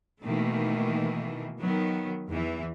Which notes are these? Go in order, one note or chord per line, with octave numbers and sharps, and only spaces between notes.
B2 D#3 E3 A3 A#3
D#3 F#3 B3
E2 E3